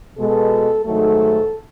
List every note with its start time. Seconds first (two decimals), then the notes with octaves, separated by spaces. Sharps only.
0.17 B2 G#3 A4
0.85 G#2 D#3 F#3 A3 A4